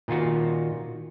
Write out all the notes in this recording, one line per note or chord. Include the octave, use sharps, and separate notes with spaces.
A#2 D#3 F4 F#4